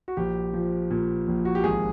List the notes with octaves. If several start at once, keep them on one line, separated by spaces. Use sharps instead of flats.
F#4
A#1 G4
F3
A#2
A#1
F#4
G4
G#1 G#4